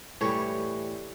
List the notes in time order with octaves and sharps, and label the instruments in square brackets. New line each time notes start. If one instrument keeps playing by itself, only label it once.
[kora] A2 E3 G3 C#5